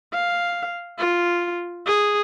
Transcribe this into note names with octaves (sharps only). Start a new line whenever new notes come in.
F5
F4
G#4